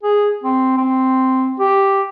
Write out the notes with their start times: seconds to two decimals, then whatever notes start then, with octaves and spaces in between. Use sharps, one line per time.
0.03 G#4
0.43 C4
0.77 C4
1.60 G4